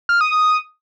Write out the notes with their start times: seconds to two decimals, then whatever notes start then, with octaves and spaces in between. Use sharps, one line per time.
0.09 F6
0.21 D#6
0.33 D#6